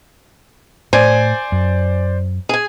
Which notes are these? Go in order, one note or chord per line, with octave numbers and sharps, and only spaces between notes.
A2 C5 D5 G#5
F#2
G#4 G#5